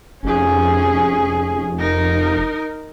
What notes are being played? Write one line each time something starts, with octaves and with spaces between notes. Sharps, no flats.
F1 C#4 G#4
D#4 A#4